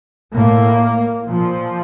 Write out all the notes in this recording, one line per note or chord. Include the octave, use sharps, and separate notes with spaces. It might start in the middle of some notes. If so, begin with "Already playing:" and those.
A2 A#3
A#2 F3